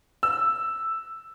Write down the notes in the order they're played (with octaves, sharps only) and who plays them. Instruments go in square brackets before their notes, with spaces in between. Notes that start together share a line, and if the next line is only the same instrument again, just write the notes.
[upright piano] E6